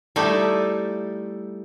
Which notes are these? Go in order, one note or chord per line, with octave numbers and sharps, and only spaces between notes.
G3 A3 D#4 E4